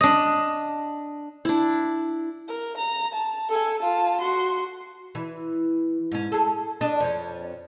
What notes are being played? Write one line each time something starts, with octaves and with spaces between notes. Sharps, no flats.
D4 D#5
D4 E4
A#4
A#5
A5
A4 G#5
F4 A5
F#4 C6
E3
G#2 C#4
G#4 A4
D4 D#5
F2 C#4